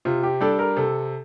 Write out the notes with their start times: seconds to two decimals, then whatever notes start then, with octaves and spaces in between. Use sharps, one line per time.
0.05 C3 F4
0.23 G4
0.41 G3 D4 A4
0.59 A#4
0.77 C3 A4